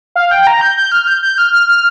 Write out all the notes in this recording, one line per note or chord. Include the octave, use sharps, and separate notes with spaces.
F5
G5
A#5
G6
G6
F6
G6
G6
F6
F6
F6